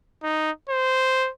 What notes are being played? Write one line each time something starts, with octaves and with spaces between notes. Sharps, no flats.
D#4
C5